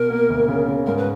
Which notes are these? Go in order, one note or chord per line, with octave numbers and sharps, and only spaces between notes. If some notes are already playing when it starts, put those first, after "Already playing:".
Already playing: B2 A#4
A#3
D2
C#3
C#3
G#2 A#4
B4